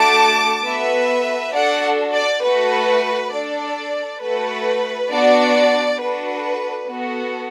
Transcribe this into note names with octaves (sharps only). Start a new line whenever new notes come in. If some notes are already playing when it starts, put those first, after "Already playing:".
Already playing: A3 D4 F#4 A4 A5 D6
B3 F#4 A4 B4 E5
D4 F#4 A4 D5 F#5
D5
A3 F#4 A4 B4
D4 A4 D5
A3 F#4 A4 B4
B3 D4 F#4 D5
D4 F#4 A4 B4
B3 F#4 A4